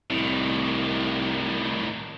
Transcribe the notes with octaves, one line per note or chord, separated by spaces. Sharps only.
C2 A2 D#3